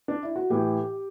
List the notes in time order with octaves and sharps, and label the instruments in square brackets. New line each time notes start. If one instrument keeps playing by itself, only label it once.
[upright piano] D4
E4
F#4
A2 E3 G4